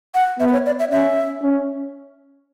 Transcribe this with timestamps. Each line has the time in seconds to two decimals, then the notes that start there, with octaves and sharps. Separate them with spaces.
0.15 F#5
0.40 B3 E5
0.48 B4
0.53 C#5
0.66 D5
0.79 E5
0.91 C#4 E5
1.42 C#4